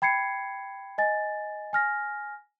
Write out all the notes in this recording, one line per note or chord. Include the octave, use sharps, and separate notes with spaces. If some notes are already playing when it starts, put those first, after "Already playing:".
G5 B5 G#6 C7 C#7
D#5 G#5 A6
G#5 F6 A#6